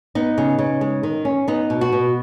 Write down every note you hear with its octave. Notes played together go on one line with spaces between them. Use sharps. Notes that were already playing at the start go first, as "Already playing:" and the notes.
B3 D#4
C#3
C#3
G#3
D#3
C#4
B3 D#4
B2
F#4
B2